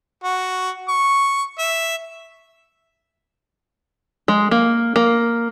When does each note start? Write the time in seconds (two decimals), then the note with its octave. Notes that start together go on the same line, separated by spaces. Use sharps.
0.23 F#4
0.88 C#6
1.59 E5
4.28 G#3
4.51 A#3
4.96 A#3